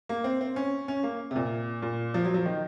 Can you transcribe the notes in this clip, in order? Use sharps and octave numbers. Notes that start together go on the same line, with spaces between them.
A#3
C4
C4
C#4
C#4
A#3
C3
A#2
A#2
F3
F#3
F3
D#3